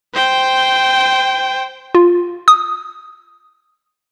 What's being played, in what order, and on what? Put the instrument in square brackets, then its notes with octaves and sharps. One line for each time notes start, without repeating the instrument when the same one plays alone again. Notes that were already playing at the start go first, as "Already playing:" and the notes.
[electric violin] C5 G5
[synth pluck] F4
D#6